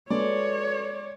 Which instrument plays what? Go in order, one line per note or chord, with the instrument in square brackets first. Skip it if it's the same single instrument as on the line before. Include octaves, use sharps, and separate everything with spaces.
[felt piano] G#3 [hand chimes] F#4 A4 B4 [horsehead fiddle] C#5 [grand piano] D5